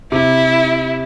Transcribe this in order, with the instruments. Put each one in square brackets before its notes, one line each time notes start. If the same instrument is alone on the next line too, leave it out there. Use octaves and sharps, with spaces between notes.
[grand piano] C3 [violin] E4